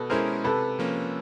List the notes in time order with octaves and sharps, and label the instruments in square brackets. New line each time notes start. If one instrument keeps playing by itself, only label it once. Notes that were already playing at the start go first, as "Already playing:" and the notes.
Already playing: [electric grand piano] B2 [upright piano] A4 B4
[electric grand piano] G#3 C#4 E4 G#4 [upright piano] A#4 C5
[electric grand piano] C3 [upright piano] A4 B4
[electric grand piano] F3 A#3 C#4